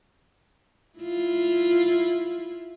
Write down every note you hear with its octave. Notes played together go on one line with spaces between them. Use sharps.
E4 F4